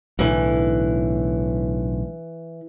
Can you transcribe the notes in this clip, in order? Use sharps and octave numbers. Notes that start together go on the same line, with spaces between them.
B1 A2 D3 E3